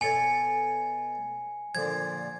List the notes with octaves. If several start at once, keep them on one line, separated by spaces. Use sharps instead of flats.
B2 A4 C#5 G#5 C#7
A#2 D3 F3 G#6